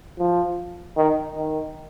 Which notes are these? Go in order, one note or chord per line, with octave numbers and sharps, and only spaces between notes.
F3
D#3
D#3